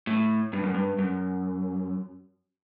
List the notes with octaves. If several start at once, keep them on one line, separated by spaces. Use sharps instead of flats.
A2
G2
F#2
G2
F#2